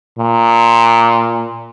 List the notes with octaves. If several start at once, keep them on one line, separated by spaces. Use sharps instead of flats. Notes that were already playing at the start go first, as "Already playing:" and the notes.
A#2